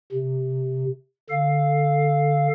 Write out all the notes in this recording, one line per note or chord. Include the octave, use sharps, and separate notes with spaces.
C3
D3 A4 F5